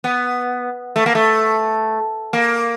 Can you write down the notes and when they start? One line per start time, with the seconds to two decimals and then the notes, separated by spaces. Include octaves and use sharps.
0.04 B3
0.96 A3
1.06 A#3
1.15 A3
2.33 A#3